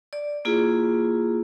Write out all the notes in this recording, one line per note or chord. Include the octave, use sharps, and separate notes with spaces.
D5
A#3 E4 F4 G#4